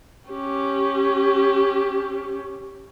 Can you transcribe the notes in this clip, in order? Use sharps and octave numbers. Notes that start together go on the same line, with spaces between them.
C#4 G4